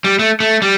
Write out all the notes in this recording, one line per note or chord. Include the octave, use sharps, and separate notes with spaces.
G3
A3
A3
G3